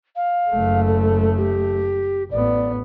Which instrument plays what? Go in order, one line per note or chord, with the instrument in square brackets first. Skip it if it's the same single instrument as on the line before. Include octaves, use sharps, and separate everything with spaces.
[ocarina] F5
[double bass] F#1 A3
[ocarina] A4
G4
[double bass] A1 B3 [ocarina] D5